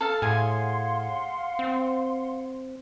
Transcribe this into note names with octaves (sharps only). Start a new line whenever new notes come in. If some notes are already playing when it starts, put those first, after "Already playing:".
A4 F5 A5
A2 G#4 F5 F#5 G#5 C6
C4